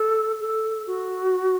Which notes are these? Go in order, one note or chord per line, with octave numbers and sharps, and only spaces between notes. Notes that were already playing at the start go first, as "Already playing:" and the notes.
Already playing: A4
A4
F#4